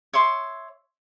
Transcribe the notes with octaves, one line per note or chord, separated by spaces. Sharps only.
C#5 E5 C6 D6